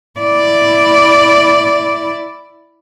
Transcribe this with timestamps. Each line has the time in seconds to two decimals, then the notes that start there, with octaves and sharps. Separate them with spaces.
0.20 E4 D5